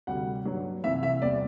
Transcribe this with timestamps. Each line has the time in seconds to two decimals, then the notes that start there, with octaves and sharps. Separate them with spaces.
0.07 D2 C3 G3 F#5
0.45 G2 F#3
0.84 C2 C3 E3 E5
1.03 E5
1.22 E2 C3 G3 D5